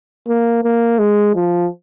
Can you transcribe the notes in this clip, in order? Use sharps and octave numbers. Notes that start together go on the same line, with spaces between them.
A#3
A#3
G#3
F3